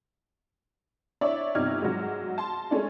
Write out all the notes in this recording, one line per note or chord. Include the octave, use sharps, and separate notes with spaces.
D4 E4 C#5 D5 E5
G1 C3 D#4 D5 F6 G#6
G#2 F#3
A5 C6
G#3 A3 C#4 D4